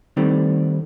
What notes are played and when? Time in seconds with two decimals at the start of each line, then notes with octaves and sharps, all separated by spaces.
0.17 D#3 G3 A3 C4 D4